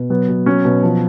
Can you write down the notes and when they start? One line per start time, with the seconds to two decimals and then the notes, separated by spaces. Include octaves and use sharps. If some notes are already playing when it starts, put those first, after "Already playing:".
Already playing: B2
0.10 F#3 B3
0.28 B2
0.46 F#3 C#4
0.65 B2
0.83 F3